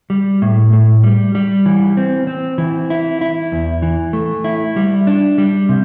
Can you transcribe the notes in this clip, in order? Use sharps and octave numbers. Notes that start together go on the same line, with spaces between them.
G3
A2
A2
G3
G3
E3
C4
C4
E3
E4
E4
E2
E3
A3
E4
G3
D4
G3
C3